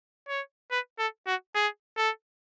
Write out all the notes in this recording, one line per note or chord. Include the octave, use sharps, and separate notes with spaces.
C#5
B4
A4
F#4
G#4
A4